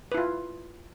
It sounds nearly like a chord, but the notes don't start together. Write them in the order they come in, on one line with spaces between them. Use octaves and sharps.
B4 E4 F4